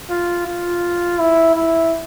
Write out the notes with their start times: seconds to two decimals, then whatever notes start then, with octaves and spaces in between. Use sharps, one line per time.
0.10 F4
0.47 F4
1.19 E4
1.55 E4